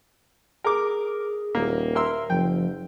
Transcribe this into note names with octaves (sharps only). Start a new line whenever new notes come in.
G#4 A#4 D6
D#1 A#3
A#4 E5 C6 E6
F#1 F3 G5